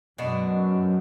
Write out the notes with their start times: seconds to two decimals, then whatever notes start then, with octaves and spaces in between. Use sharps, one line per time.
0.18 F#2 B2 G#3 D4 F#4